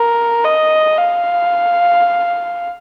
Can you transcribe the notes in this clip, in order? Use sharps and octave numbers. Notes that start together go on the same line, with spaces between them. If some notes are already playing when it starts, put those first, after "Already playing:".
Already playing: A#4
D#5
F5